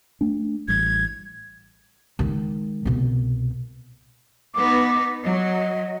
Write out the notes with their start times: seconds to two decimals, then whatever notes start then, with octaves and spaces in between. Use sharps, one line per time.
0.21 A3 D4
0.68 A1 G3 G#6
2.19 D#3 G#3
2.85 C2 B2
4.54 B3 D#4 D6
5.24 F#3 D#5